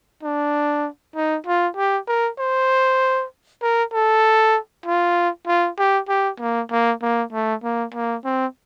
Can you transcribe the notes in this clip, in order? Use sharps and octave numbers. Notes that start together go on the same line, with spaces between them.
D4
D#4
F4
G4
A#4
C5
A#4
A4
F4
F4
G4
G4
A#3
A#3
A#3
A3
A#3
A#3
C4